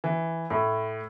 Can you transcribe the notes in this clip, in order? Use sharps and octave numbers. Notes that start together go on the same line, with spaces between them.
E3
A2